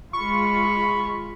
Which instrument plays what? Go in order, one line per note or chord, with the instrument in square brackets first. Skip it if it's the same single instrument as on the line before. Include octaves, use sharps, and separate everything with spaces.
[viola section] G#3 F4 [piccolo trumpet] B5 [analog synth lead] C#6